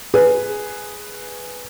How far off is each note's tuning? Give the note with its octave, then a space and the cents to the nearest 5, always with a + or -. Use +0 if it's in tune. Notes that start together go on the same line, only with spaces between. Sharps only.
G#4 +0 B4 +0